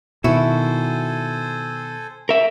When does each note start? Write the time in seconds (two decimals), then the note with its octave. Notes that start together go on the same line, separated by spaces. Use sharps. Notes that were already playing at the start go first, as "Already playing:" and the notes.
0.24 B2 D#3 E4 F#4 A4 C5 G#5
2.29 A#4 E5